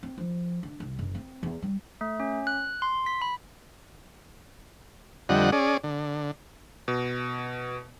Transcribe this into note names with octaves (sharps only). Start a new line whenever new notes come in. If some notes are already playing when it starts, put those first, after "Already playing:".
C4
F3
D3
C2
F#1
C4
E2
G3
A3
C#4
F#6
C6
B6
B5
F2 D3 G3 D#5 F#5
C#4 G#4 D5
D3
B2